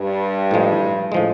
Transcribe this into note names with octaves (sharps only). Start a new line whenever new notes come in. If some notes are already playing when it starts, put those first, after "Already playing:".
Already playing: G2
A2 F3 G#3
A2 F3 G#3